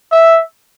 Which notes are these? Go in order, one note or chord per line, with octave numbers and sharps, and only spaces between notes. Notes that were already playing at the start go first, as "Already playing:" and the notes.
E5